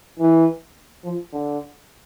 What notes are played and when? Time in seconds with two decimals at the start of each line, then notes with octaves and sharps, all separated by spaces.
0.20 E3
1.04 F3
1.33 D3